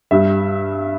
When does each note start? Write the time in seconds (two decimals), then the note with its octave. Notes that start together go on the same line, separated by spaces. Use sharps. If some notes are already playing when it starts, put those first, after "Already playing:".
0.11 G2 G3 E5